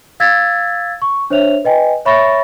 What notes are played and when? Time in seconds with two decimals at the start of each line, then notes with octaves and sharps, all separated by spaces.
0.20 F5 E6 G#6 A6 B6
1.02 C#6
1.30 D4 C5 C#5 E5 F7
1.64 B4 D#5 G5 G#5
2.05 C#5 E5 B5 C#6 A6 A#6